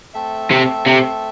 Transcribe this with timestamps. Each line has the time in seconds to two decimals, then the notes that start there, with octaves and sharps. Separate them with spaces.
0.14 A3 C4 A4 E5
0.51 C3
0.86 C3